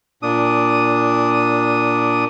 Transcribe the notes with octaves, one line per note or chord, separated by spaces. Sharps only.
A#2 D4 D#6